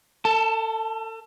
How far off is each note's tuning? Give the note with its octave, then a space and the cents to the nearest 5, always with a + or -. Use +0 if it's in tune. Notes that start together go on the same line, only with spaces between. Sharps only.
A4 +35 A5 +0